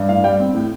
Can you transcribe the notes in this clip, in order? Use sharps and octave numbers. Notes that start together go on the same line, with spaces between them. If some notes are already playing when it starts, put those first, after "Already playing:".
Already playing: G2
A2 F5
G3 G5
C4
A2